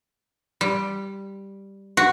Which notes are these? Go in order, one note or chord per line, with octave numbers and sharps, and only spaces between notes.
G3
F#4